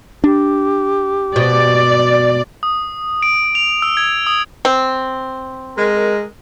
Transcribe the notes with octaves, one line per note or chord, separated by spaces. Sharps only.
D4 G4
B2 D5
D#6
D7
F7
E6
G#6
D#6
C4
G#3 A#4